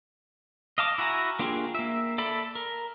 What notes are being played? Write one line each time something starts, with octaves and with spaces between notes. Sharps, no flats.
D#5 F5 A5 D6
E4 F#4 G#5 A#5
A#3 D4 F4 G4 G#4
A#3 E5
A4 D5 E5 A5 B5
A#4